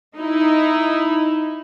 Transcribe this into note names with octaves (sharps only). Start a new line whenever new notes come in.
D#4 E4